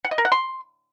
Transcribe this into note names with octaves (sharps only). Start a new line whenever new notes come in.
F#5
D#5
A#4
F#5
C6